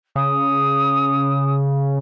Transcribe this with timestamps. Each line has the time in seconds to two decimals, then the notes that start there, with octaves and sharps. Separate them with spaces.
0.16 C#3 D#6